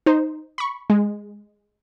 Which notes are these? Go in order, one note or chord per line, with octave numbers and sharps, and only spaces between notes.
D#4 C5
B5 C#6
G#3